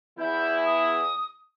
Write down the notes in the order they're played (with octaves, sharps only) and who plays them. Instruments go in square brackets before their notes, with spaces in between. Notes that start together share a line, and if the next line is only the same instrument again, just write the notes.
[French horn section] E2 E4 [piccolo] G6
[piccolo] D#6